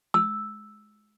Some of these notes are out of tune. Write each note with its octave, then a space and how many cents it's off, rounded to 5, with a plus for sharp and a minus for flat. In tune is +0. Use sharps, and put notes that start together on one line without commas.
E6 +0